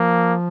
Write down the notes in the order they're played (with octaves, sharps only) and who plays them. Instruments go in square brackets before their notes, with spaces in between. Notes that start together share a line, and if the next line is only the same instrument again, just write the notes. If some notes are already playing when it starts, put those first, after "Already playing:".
Already playing: [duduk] F3 [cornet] A#3